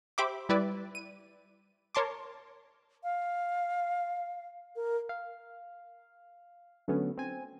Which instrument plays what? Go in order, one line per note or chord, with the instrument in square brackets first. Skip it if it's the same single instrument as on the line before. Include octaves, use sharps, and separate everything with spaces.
[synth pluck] G4 C5 E5 B5 D6
G3 E4 B4 D5
D#7
A#4 C#5 A5 C6 D6
[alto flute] F5
A#4
[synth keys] F5
D3 F#3 A3 B3 C#4
C4 G#5